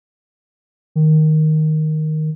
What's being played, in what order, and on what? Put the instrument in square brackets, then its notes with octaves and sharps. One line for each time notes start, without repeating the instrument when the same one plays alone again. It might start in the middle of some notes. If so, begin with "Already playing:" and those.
[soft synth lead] D#3